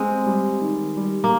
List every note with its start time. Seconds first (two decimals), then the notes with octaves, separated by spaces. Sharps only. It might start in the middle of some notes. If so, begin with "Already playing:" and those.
Already playing: G#3 C4
0.26 G3
0.61 D#3
0.97 G3
1.24 A#3